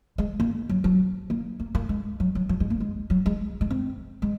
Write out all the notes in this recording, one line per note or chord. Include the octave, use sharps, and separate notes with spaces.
G#3
A#3
F#3
F#3
A#3
A#3
A#3
G#3
F#3
F#3
F#3
G#3
A#3
G#3
F#3
G#3
G#3
C4
G#3